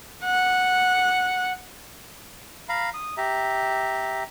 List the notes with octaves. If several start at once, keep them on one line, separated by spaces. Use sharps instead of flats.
F#5
F5 A#5 B5
D#6
G4 E5 A#5